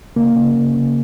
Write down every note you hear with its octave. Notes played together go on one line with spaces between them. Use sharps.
C#3 A#3
C#3
C#3
C#3